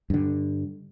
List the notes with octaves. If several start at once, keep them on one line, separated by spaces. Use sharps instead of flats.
G2 D3